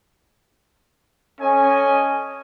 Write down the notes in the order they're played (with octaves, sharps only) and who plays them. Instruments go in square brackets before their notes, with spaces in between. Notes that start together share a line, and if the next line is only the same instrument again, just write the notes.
[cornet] C#4 [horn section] A4 D#5 G#5